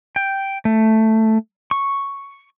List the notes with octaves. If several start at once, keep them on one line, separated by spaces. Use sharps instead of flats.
G5
A3
C#6